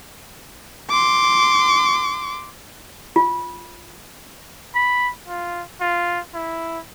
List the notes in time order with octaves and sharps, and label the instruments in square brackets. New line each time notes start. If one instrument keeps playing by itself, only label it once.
[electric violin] C6 D6
[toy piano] F4
[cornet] B5
F4
F4
E4